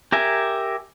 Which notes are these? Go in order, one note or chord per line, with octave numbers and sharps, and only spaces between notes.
G4 A#4 E5 G#5